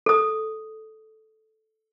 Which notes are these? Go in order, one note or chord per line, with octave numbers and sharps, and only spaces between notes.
A4 D#6